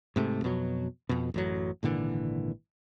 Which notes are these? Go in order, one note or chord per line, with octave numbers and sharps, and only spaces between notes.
G#2 C3 A3
F2 B2 F#3
F2 B2
A1 F#2 F#3
G#1 A#2 D3 E3